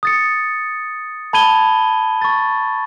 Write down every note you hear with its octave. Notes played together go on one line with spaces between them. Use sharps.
D#6 A6 C#7
A5 B5 G#6 D#7 G7
C#6 A6